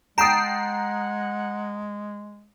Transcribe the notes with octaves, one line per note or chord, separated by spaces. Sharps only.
G#3 F#5 G5 A5 A#5 D#6 C7